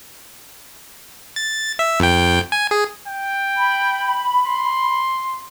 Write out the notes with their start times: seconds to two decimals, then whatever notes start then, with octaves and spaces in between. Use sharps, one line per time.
1.36 A6
1.79 E5
2.00 F2 G5
2.52 G#5
2.71 G#4
3.07 G5
3.56 B5
4.47 C6